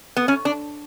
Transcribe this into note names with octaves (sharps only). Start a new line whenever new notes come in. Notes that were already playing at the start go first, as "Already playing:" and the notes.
B3
C#4
D4